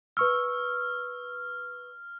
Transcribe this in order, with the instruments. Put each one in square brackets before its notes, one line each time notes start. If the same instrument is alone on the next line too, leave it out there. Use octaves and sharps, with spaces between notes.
[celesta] B4 C#6 E6 [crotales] F6